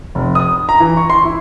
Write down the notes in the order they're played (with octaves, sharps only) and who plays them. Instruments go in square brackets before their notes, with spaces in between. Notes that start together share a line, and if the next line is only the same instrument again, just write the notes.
[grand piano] F1
D#6
A#5
E3
C#6
C6
E4